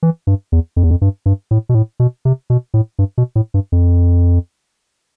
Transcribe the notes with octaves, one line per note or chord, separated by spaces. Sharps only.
E3
G2
E2
F2
E2
F2
G2
G2
A2
B2
A2
B2
C3
B2
A2
G2
B2
A2
G2
F2